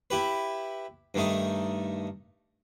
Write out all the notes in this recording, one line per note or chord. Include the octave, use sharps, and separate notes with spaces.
E4 G4 B4
G2 D#3 A3 D#4